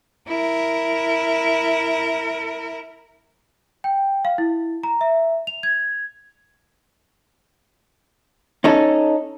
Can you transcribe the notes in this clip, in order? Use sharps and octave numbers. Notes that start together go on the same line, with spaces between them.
E4 A#4
G5
F5
E4
A#5
E5
F7
G#6
C#4 D#4 A4